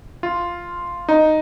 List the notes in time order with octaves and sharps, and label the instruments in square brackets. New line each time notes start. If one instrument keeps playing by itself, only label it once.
[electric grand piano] F4
D#4